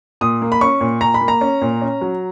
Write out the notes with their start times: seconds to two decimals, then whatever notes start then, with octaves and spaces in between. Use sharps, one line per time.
0.21 A#2 D#6
0.42 A#3
0.52 B5
0.61 C#4 C#6
0.81 A#2
1.01 A#2 A#5
1.14 B5
1.21 A#3
1.28 A#5
1.41 C#4
1.62 A#2
1.82 C#4
2.01 F#3